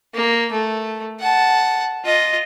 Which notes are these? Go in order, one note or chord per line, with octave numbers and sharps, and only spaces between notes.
A#3
A3
F#5 A5
F4 D#5